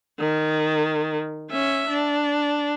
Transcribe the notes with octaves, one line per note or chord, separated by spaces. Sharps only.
D#3
C#4 E5
D4